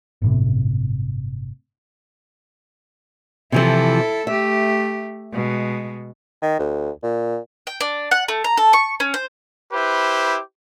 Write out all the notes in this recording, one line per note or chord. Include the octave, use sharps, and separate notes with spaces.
G1 A2 C3
C3 E3 F3 E4 A4
A3 G4 E5
B2 G#3
D#3
D2
A#2
G5
D4
F#5
A3
A#5
A4
C#6
C#4
C5
E4 G4 B4 C5